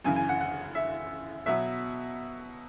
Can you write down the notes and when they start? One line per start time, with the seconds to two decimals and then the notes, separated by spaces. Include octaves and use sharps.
0.04 F#2 C#3 E3 G#5
0.16 G#5
0.29 F#5
0.41 F#5
0.75 E5
1.46 B2 F#3 B3 E5